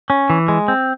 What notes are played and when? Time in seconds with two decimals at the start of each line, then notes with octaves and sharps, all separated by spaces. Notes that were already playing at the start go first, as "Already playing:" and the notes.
0.10 C#4
0.30 E3
0.48 G#3
0.68 C4